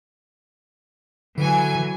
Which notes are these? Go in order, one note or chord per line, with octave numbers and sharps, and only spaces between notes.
D3 E3 F#3 G#5